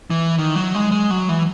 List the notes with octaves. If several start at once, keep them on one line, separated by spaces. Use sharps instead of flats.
E3
D#3
F#3
G#3
G#3
F#3
E3